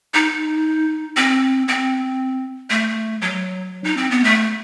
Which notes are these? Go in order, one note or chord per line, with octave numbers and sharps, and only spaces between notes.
D#4
C4
C4
A3
F#3
D#4
C4
B3
A3